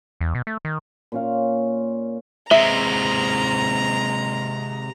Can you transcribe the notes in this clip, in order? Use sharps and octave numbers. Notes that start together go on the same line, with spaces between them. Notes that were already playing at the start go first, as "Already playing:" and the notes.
E2
B2
A3
D#3
A#2 C#4 F5
C3 G#3 E5 A#5